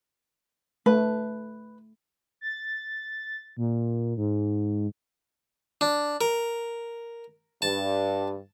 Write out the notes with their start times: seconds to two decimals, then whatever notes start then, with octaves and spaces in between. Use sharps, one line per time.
0.86 A3 B4
2.41 A6
3.57 A#2
4.17 G#2
5.81 D4
6.21 A#4
7.62 G2 A5